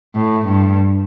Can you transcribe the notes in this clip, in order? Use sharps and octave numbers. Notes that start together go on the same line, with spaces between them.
A2
G2